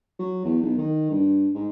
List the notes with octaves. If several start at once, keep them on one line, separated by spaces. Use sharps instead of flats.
F#3
E2
B1
D#3
G2
G#2